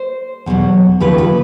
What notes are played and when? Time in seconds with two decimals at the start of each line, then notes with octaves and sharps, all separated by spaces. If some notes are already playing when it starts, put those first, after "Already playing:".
Already playing: C5
0.46 E2 B2 F#3
1.00 D#2 C#3 F3 B4
1.18 B4